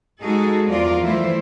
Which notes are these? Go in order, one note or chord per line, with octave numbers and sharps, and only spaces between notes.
G#3 D#4 F#4 G#4 A4
E2 F3 F4 A#4 D5
E3 F3 G3 A3 E4 C5